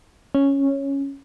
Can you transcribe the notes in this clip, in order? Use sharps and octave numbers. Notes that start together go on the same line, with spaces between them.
C#4